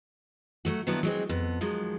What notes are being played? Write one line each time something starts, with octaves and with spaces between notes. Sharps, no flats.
F#3 A3 F#4
D#3 F3 F#3 B3 D4 E4
F#3 G#3 C4
F2 B3
D#3 F3 F#3 G#3